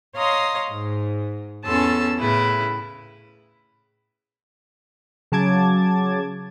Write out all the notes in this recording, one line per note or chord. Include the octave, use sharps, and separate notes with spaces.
C#5 D#5 F5 A#5 C6 D#6
G#2
E2 C#4 A4 A5 C6 E6
A2 C#3 E4 B4
C#3 F#3 A5 D6 G#6